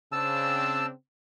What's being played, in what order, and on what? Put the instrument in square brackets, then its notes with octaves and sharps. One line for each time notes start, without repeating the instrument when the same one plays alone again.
[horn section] C#3 C4 D4 [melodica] A5 E6